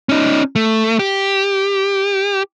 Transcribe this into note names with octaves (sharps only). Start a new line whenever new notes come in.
C#4 D#4
A3
G4